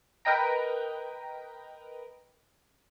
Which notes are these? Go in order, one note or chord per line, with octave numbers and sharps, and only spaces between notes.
A#4 B4 D#5 G5 A#5